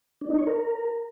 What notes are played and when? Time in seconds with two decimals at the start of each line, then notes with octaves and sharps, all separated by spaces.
0.21 D4
0.30 D#4
0.38 C#5
0.47 A#4